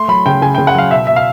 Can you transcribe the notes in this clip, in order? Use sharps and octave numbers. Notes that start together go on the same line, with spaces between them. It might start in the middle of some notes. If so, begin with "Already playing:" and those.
Already playing: A3 C6
F#3 B5
C#3 G5
C#3 G#5
C#3 G5
F#5
F#3 F5
B2 E5
B2 E5
F5